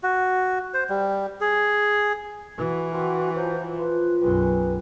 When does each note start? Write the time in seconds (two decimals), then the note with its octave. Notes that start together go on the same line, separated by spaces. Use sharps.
0.03 F#4
0.74 C5
0.89 G3
1.41 G#4
2.58 E3 F#4
2.92 C4 D4 F#4 A#4
3.35 F3 F#3 C5 C#5
3.78 F3 B4 C5
4.21 B1 F#2 G3 G#4 B4 C6